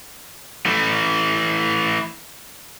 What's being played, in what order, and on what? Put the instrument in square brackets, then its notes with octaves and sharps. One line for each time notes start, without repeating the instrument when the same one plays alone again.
[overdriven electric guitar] E3 A3